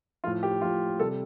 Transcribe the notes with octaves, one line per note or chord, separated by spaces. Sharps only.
A2 F3 F4
G4
A2 F3 F4
C3 G3 A4